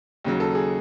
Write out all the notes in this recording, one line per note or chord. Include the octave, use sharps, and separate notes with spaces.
D#2 C#3 F#3
A4
G#4